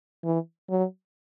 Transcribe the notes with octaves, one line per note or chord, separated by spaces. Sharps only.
E3
F#3